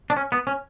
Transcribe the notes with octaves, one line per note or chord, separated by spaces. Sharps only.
D4
C#4
B3
C#4